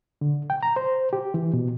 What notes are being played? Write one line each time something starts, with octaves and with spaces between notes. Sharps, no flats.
D3
G5
A#5
C5
G4
E3
B2